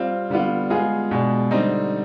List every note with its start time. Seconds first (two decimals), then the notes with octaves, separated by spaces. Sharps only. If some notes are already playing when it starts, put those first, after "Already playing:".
Already playing: G3 C4 F4
0.30 D3 G3 B3 F4
0.70 G#3 B3 F4 G#4
1.11 B2 G#3 D4
1.51 D3 G3 C4 D#4